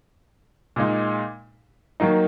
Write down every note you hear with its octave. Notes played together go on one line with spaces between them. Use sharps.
A#2 G#3 D#4
D#3 F#3 A#3 D#4